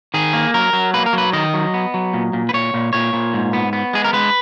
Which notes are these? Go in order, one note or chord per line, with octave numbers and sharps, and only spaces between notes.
D#3 G#4
A#3
F#3 A#4
F#3
A#3 B4
A#4
F#3 B4
D#3 D#5
F#3
B3
F#3
A#2
A#2
B4
A#2 C#5
A#2
A#2 C#5
A#2
G#2
B3
B3
G#3 G#4
A#4
G#3 B4